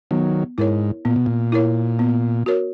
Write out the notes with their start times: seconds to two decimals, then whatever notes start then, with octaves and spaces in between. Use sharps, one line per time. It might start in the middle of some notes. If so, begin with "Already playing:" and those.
0.11 D#3 F#3 B3
0.58 G#2 E4 A#4 C#5
1.05 A#2 B3
1.16 B2
1.26 A#2
1.52 E4 A#4 C#5
1.99 B3
2.46 F#4 A#4 C#5